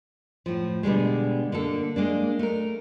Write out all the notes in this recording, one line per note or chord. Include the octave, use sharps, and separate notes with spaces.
A2 F3
B2 D3 G3 G#3
D3 A#3 A4
G#3 A#3 D4
A3 A#4